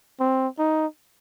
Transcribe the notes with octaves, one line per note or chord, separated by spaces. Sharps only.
C4
D#4